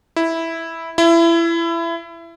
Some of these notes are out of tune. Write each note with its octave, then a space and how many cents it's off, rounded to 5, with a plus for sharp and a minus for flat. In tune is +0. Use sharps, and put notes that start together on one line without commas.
E4 -5
E4 +25